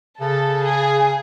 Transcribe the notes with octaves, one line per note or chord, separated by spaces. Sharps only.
C#3 A4
G#4